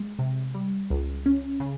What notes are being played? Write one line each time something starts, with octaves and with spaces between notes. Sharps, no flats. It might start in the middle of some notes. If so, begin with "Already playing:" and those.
Already playing: G#3
C3
G3
C#2
C#4
C#3